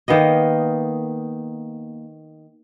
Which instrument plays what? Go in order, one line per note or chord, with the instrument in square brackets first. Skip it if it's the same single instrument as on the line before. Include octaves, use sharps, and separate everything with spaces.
[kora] D#3 A#3 B3 D#5